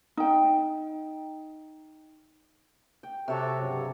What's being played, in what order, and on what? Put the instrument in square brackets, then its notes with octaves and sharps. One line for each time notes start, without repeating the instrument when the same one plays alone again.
[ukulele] D#4 G5
[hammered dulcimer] G5
[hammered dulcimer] C3 C#5 D6 [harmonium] F#4 A4 E5
[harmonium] G2 C#3 F#3